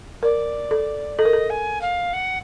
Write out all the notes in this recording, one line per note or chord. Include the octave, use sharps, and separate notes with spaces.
A#4 D5
A4
A4 D#5
A#4
A4
G#5
F5
F#5